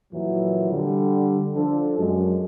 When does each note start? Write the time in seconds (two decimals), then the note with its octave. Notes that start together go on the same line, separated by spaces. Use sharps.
0.13 F2 A#2 E3 F#3
0.71 D3 G3
1.55 F3 D4 A4
1.98 F#2 G#3